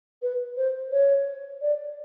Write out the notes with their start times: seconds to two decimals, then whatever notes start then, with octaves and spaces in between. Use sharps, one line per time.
0.22 B4
0.57 C5
0.92 C#5
1.61 D5